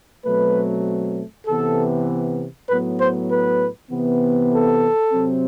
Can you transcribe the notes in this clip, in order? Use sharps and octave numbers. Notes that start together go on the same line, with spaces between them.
B2 F#3 A3 C4 B4
C3 E3 B3 A4
A2 F#3 B3 B4
C5
B4
C3 E3 B3
A4
C3 F#3 C4